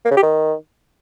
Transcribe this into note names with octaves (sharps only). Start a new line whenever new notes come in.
A#3
C#3
G4
D#3